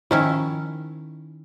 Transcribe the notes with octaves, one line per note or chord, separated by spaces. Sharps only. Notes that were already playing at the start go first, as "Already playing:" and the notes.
D#3 F3 C#4 D#4 E4